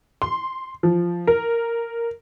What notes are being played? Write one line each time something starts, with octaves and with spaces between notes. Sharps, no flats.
C6
F3
A#4